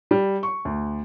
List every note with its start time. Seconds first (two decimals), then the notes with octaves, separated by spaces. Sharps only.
0.11 G3
0.43 C#6
0.65 D2